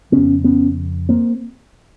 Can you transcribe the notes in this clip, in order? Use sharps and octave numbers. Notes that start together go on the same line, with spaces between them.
F2 C#3 B3 C#4
B3 C#4
A#3 C4